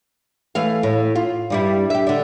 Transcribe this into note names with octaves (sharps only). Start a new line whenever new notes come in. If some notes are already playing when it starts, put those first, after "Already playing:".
E3 A3 F5
A2
F4
G2 G3 E4
G4 E5
D3 D4